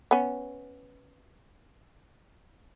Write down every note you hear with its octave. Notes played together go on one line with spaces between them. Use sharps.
B3 C#4